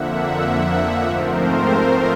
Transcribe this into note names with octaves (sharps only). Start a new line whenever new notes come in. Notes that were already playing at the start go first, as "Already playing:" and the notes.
Already playing: F2 D3 F3 A#3 E5 F#5
G#2 F3 A3 C4 A#4 C5